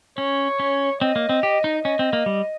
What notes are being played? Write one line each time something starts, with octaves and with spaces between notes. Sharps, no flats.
C#4 C#5
C#4
C4 D#5
A#3
C4
G4
D#4
C#4 D#5
C4
A#3
G3